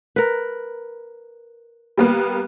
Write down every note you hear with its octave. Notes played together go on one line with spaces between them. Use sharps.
A#4 B4
G3 A#3 B3